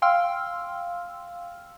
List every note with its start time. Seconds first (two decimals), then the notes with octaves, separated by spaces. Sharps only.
0.02 F5 G5 C6 E6 F6